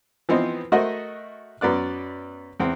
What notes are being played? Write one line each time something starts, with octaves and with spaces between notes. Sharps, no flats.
E3 F3 B3 C4 D#4 C5
A3 F#4 A#4 C5 D#5 F#5
F#2 B3 D5 F#6
E2 C4